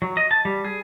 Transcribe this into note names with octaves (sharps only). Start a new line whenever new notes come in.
F#3
D#5
A5
G3
G#4